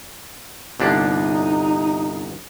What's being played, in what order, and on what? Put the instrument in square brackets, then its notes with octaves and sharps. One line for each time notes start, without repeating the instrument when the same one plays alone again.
[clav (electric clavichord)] G1 C2 D4 [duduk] D#4